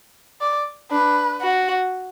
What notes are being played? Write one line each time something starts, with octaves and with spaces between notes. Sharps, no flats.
D5
D4 B4
F#4